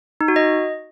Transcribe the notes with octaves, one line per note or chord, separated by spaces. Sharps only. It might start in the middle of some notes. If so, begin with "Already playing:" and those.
D#4
F#4
D#5